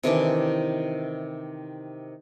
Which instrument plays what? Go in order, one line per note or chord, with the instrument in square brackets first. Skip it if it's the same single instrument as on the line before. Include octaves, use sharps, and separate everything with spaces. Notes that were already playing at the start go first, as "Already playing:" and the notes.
[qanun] C3 D#3 E3 D4